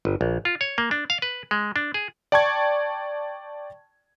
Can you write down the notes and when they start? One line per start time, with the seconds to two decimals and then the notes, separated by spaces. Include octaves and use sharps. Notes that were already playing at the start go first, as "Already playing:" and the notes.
0.05 G1
0.21 A#1
0.45 F4
0.61 C#5
0.78 A#3
0.91 D4
1.10 F5
1.22 B4
1.51 G#3
1.76 D4
1.94 G#4
2.32 D5 G5 A5 C#6 G#6